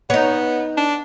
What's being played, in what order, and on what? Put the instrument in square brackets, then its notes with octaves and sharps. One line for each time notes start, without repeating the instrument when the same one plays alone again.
[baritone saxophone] B3 [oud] D#4 C#5
[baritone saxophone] D4